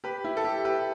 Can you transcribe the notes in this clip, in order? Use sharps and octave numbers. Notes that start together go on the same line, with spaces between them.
G4 B4
E4 G4
A4
E4 G4
G4 B4